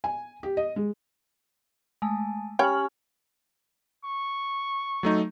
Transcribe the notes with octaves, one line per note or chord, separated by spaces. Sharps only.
G#5
G4
D#5
G#3
G#3 A3 G#5 A5
C#4 G4 C#5 G5 B5 F6 F#7
C#6
F#3 A3 D#4